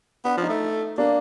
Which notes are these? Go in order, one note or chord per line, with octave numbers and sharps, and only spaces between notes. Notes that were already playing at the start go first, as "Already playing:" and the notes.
B3 D4
F3
D#4
A3
A#3 D4